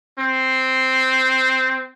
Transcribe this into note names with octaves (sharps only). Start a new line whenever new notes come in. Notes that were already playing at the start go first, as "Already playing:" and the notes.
C4